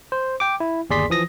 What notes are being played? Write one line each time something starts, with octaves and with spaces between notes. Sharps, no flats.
C5
G5 D6
E4
G1 D#2 G#4 D5 C6 B6
E3 F3 D#6 A#6